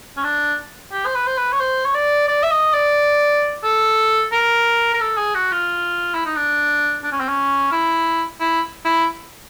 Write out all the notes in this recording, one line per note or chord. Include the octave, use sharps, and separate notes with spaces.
C#4
D4
G4
C5
B4
C5
B4
C#5
C5
C#5
D5
D5
E5
D#5
D5
A4
A#4
A#4
A4
G#4
F#4
F4
E4
D#4
D4
D4
C#4
C4
C#4
E4
E4
E4